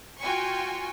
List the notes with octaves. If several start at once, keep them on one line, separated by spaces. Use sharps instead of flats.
F4 F#4 G5 G#5 C#6